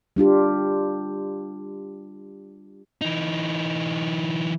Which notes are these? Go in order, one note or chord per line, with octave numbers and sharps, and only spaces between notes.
G3 D4 F4 G4
E3 D#4